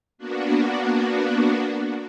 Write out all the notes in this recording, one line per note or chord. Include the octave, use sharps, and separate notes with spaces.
A#3 B3 D4 F#4